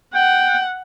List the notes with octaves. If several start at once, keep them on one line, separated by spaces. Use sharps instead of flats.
F#5 G5